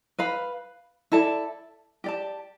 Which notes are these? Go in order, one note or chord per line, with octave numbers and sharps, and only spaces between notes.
B4 F5 B5
E4 A4 D5 A5
G4 D5 A5